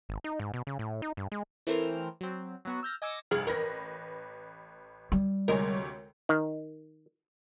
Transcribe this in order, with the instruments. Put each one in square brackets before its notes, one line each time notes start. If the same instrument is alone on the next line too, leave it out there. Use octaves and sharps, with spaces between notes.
[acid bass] G#1
D#4
G#2
B2
C#3
A2
D#4
G2
G#3
[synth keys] E3 A3 C4 A#4 C5 F6
F#3 C4
F#3 B3 F#4
E6 F6 G6 A6 A#6
D#5 G#5 D6 E6 A#6 C#7
[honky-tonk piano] F1 G2 F#7 [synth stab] G#4 F6
[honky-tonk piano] A1 B4 A#6 [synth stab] A#4
[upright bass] G3
[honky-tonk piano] D2 C3 C#5 [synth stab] G#3 A#4
[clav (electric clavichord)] D#3